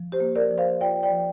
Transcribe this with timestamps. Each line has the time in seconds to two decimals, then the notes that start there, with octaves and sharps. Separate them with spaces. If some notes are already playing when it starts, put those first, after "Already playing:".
Already playing: F3
0.12 G4 C5
0.20 A#3
0.36 A#4 D5
0.51 F3
0.58 C5 F5
0.81 F4 D5 G5
1.03 D5 G5
1.11 F3